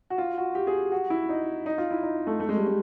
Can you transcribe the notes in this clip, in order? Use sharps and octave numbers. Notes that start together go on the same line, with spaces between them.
F#4
F4
F#4
G4
G#4
G4
F#4
E4
D#4
D#4
F4
E4
D#4
A3
A3
G#3
G3
G#3